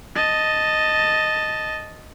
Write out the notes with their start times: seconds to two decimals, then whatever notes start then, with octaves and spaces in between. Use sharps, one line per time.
0.15 D#5 A5